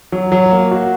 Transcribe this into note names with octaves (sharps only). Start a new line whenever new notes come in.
F#3
F#3
A#3
F#4